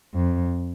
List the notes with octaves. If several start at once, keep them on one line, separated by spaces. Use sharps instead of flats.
F2